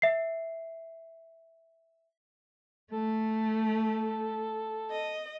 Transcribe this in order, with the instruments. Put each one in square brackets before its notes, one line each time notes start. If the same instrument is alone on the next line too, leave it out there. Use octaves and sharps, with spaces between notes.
[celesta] E5 C7
[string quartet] A3 [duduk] A4
[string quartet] D#5